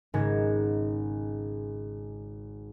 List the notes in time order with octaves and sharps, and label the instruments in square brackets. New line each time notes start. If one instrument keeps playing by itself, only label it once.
[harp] G#1 G#2 C#3 G#3 G#6 A#6